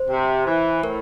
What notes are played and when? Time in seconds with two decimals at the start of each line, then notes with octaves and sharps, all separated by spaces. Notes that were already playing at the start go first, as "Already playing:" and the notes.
Already playing: C5
0.09 C3
0.46 E3
0.83 A2 A#4